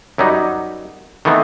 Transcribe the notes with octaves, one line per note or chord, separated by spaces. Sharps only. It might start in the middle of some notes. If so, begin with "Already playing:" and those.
F#2 F#3 G3 D#4
D#3 E3 A3 B3 C4